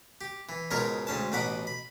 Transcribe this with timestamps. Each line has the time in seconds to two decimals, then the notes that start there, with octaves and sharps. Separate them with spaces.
0.21 G4
0.49 E3
0.71 C#2 G#2 B2 A#4 C#5 C#6
1.07 D2 G#2 C#4 A5
1.32 A1 B2 D#4 F#5 B5 D6
1.67 B5